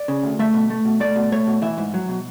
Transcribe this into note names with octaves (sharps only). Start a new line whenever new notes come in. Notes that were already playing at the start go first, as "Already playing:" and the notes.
Already playing: D5
C#3
D2
A3 E5
B2
A3
B2
A3 D5
B2
A3 C#5
B2
E3 E5
G#2
F#3
B2